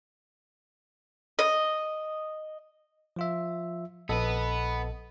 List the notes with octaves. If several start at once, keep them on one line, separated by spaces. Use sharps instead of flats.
D#5
F3 F4 E5
A#1 B3 A4 B4 D#5